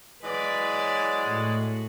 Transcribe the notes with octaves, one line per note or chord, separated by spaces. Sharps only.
E3 F#3 G#3 B4 D5
A2 F#4